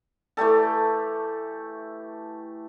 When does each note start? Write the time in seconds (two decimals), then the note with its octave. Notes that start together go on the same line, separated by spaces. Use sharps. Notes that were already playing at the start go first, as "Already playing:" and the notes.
0.37 E3 A3 G4 A4